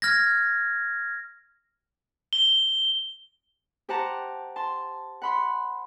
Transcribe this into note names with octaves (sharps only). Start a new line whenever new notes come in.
F6 G#6 A#6
G7
G4 C5 F#5 A5 A#5
A5 C6
F#5 B5 C6